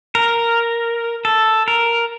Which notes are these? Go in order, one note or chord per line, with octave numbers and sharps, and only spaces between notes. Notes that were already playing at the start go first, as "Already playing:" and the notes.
A#4
A4
A#4